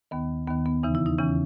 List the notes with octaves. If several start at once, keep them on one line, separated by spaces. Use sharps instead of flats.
D#2 D#3 B3
D#2 D#3 B3
B3
E2 C#3 E3 D#4
E4
D#4
E2 C#3 E3 C#4